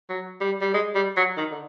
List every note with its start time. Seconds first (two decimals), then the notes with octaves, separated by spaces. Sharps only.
0.09 F#3
0.41 G3
0.61 G3
0.74 G#3
0.95 G3
1.17 F#3
1.37 D#3
1.51 D3